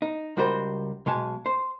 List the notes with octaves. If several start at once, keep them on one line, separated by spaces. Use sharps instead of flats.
D#4
C#2 G3 F#4 A#4 C5
B1 B2 G#3 G#5 A5
C5